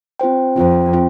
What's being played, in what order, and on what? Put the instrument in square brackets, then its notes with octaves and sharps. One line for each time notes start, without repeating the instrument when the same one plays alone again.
[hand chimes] C4 F4 C5 G5
[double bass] F2 [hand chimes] C4 F4 C5 G5
[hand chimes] C4 F4 C5 G5